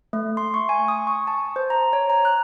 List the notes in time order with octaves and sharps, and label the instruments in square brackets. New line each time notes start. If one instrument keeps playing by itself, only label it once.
[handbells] A3
C6
C#6
G#5
D#6
C#6
A5
C5
A#5
C#5
A#5
F#6